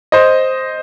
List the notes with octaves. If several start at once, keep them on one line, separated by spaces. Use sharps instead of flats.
C5 D#5